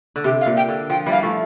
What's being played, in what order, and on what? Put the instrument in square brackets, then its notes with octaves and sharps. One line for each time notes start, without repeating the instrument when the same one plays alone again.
[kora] D3
[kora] C3 [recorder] G4
[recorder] F5
[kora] A#2
[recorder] G5
[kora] D3
[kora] F3 [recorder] G5
[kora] E3 G3
[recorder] F5
[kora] F3 A3